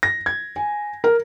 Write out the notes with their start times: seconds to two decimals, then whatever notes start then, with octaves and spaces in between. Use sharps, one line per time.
0.03 A#6
0.26 G#6
0.56 G#5
1.04 A#4